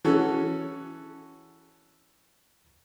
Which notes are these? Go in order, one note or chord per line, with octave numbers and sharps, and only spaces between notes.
E3 C#4 F#4 A4